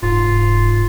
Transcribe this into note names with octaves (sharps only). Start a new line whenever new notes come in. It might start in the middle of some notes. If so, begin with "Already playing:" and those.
F1 G#2 F4